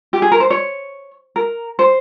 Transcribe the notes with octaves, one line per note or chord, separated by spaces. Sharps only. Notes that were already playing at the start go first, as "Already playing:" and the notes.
G4
G#4
A#4
C5
C#5
A#4
C5